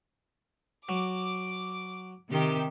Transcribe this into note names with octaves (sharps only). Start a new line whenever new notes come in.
F#3 D6
C3 D#3 G4